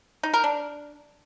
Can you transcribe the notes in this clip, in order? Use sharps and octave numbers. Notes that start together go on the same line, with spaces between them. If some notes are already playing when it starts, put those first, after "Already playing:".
D#4
A#4
D4